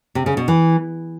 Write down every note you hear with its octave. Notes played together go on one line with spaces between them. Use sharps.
C3
C#3
B2
E3